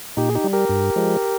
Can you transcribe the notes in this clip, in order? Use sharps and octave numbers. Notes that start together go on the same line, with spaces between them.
A#2 D#4 G4
G#4
D#4 G4
G3
G4 A#4
G2
F3 G#3